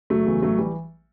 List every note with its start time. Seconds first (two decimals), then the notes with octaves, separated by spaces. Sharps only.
0.10 F#1 F#3 A3
0.27 E2 C#3 E3
0.42 A1 F#3 A3
0.58 E3 G3